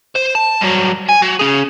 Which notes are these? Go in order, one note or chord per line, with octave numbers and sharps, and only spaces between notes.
C5
A5
G2 F#3
G#5
F#3
C#4 G#4